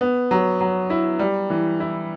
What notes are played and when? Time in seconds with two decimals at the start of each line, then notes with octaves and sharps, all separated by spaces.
0.01 B3
0.31 F#3
0.61 F#3
0.90 E4
1.19 G3
1.50 E3
1.80 E4